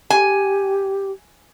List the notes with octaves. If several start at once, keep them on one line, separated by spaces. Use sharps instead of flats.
G4 G#5